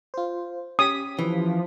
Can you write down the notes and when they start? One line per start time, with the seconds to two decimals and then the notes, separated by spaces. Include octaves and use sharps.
0.14 F4 C5
0.79 C#4 G4 D#6 B6
1.19 E3 F3